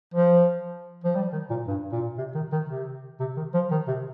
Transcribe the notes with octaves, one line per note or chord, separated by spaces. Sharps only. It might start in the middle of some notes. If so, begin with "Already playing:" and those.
F3
F3
G3
D#3
A#2
G2
A#2
C3
D#3
D#3
C3
C3
D#3
F3
D#3
C3